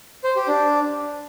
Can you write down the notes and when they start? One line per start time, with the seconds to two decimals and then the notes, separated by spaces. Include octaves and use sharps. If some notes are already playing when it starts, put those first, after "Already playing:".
0.24 C5
0.36 G4
0.48 D4